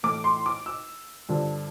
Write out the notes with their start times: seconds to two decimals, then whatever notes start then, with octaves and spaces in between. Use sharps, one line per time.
0.03 A2 E3 A3 D6
0.24 C6
0.46 D6
0.66 E6
1.29 G2 D3 F3